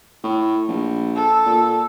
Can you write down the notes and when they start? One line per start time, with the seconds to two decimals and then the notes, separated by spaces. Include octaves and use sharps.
0.24 A2
0.69 A#1
1.15 A4
1.46 A#2